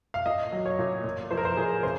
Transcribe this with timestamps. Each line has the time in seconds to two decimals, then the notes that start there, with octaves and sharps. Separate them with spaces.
0.14 F5
0.26 A#2 D#5
0.52 F#3
0.66 C#5
0.79 A#2
1.04 A#2
1.31 F3 C5
1.37 A#4
1.45 C5
1.57 A#2 G#4
1.83 C#3 C5